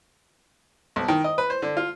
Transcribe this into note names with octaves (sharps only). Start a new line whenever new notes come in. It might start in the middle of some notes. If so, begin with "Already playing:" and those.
B1
D#3
D#5
B4
C5
D3
F4